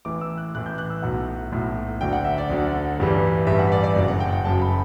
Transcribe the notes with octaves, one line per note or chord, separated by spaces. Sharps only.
A1 A2 E3 D6
E6
F#6
A1 A2 E3 F#6
G6
F#6
E6
B1 A2 F#3 F#5
B1 A2 F#3
D2 D3 F#3 G5
F#5
E5
D5
D2 D3 F#3
A1 G2 E3 G3
A1 G2 E3 G3 E5
F#5
D5
D5
F#1 F#2 F#3
F#5
G5
F#5
F#1 F#2 F#3 A5
B5